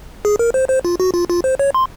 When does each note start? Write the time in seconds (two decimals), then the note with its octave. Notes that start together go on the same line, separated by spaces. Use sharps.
0.25 G#4
0.39 A#4
0.54 C5
0.69 C5
0.85 F4
1.00 F#4
1.14 F4
1.30 F4
1.44 C5
1.59 C#5
1.74 C6